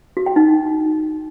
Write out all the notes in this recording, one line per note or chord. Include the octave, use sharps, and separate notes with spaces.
F#4
G5
D#4